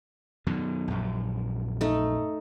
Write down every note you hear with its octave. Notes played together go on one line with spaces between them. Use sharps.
F#2 B2 D#3
A#1 F#2
A3 D#4